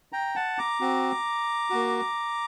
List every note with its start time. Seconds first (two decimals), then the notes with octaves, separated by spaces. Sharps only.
0.12 G5 A#5
0.36 F#5 A5
0.58 A#5 D6
0.80 C4 F#4
1.70 A#3 F#4